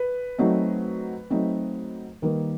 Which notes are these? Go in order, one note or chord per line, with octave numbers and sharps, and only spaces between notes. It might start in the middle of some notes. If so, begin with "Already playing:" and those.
Already playing: B4
F#3 A3 C4 D#4
F#3 A3 C4 D#4
D#3 G3 A#3 B4